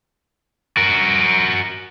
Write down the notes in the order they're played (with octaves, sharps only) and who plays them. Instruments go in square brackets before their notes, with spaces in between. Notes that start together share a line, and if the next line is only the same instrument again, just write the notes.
[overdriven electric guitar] F#4 A#4